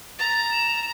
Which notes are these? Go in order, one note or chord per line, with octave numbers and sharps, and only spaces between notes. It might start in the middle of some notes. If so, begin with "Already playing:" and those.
A#5 A6
E7